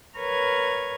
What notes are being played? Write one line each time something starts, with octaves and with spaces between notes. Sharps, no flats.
A#4 B4 C#5 C#6 F6 G#6